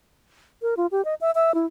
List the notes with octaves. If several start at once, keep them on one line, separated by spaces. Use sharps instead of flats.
A#4
F4
G4
D#5
E5
E5
E4